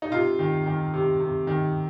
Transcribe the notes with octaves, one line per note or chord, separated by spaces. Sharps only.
D#4
C3 F4
D#3
D#3
C3
C3
D#3